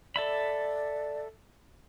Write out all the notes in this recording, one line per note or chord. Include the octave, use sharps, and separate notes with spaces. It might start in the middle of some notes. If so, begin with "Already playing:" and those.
A4 D5 E5 B5